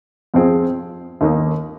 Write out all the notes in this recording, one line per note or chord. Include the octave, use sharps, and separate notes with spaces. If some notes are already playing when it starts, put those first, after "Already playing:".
F2 F3 C4 G#4
D#2 D#3 A#3